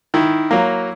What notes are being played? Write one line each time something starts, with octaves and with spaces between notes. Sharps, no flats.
D#3 E4
F#3 A#3